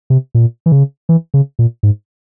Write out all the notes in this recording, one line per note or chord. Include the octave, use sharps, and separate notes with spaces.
C3
A#2
E3
C#3
E3
C#3
A#2
G#2